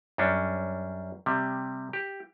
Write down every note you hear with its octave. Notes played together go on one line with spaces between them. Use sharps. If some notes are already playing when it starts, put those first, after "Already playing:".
F#2 G3 C#4 D4
C3 G3
G4